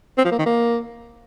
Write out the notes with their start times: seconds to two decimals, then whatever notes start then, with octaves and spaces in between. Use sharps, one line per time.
0.18 C4
0.25 F3
0.32 A#3
0.39 D#3
0.46 A#3